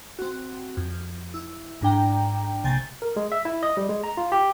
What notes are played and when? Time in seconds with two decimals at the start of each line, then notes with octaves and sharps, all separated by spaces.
0.19 C4 F#4
0.77 F2
1.34 E4
1.81 G#1 G#2 D4 G5 A#5
2.64 A#1 C3 G#5 G6 A6
3.02 A#4
3.16 G#3
3.32 E5
3.45 E4
3.63 D#5
3.77 G3
3.89 G#3
4.04 A#5
4.17 F4
4.32 G4